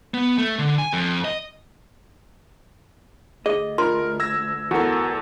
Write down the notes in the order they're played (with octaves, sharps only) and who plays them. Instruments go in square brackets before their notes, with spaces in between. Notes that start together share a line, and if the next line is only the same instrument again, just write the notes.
[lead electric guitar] B3
A3
D3
G#5
F2
D#5
[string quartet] D2 [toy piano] G#4 [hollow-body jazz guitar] D#5
[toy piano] F4 C6 [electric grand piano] A#4
[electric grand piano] E6 G#6 A#6
[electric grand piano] E2 A4 [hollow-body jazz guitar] F#4 A#4